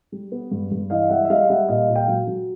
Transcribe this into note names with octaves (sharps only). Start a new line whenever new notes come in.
G3
B3
G2
G2
E3 D#5 F5
G3 E5 F#5
E5
G3 D#5 F5
G3 E5 F#5
A#2 D#5 F5
A#2
F5 G5
F#3
F#3